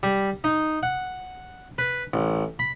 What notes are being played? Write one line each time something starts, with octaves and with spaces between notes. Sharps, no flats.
G3
D#4
F#5
B4
A1
B5